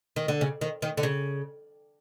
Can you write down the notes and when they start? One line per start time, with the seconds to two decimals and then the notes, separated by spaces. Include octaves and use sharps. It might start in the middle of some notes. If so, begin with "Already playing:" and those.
0.16 D#3
0.28 D3
0.41 C#3
0.61 D#3
0.82 D#3
0.97 D3
1.03 C#3